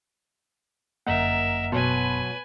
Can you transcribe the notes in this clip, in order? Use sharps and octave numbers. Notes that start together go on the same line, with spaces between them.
G1 F#2 A#3 A#4 D#5 E5 F#5 A#5
B2 F#3 B3 B4 G#5 A5 C6